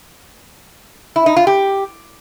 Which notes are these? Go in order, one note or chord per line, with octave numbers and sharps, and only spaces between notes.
E4
D#4
F4
G4